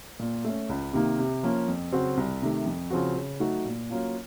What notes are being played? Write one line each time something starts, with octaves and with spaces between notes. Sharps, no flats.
A#2
A3 C#4
C#2
C3 D#3 A#3
C3
F3 A#3 C#4
F2
C#3 F#3 C4 F#4
C2
C3 D#3 A3
F2
C#3 F3 C4 F#4
C#3
F#3 A3 D#4 F#4
A#2
F#3 A#3 C#4 F4